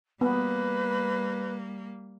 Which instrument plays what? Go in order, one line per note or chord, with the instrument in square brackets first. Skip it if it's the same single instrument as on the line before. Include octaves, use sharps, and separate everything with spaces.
[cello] G3 A#3 [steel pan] B3 [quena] B4